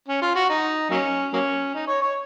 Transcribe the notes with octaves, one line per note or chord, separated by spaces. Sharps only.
C#4
F4
F#4
D#4
F#3 A#3 C#4
F#3 A#3 C#4
D#4
C#5
C#5